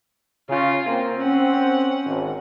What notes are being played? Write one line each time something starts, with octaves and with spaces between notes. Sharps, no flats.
C#3 F4
A#3 C4
C#4 F#5
G#1